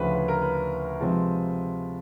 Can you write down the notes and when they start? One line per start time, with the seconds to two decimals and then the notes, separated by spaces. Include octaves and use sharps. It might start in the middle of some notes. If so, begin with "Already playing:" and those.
Already playing: D2 C#3 F3 B4 C5
0.14 B4
0.28 A#4
0.42 B4
1.00 C3 F3 G#3 C4